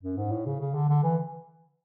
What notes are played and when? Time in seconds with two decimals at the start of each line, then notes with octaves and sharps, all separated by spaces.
0.03 F#2
0.17 G#2
0.32 A2
0.46 C#3
0.61 C#3
0.75 D3
0.90 D3
1.04 E3